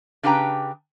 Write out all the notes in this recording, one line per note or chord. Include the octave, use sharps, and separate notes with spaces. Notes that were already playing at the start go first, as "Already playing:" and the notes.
C#3 D4 G4 B4 G5 A#5